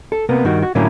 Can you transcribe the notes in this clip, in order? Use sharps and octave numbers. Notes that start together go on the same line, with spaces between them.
A4
C3 A#3 B3
G2 D#3 F#4
F#4
A2 D3 F#3 A#3 C#4 E4